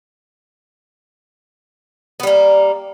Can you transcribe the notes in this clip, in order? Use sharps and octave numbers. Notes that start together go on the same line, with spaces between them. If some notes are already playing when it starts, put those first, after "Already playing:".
G3 A#3 B3